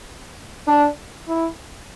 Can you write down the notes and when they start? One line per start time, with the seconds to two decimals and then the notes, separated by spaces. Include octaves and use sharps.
0.67 D4
1.28 E4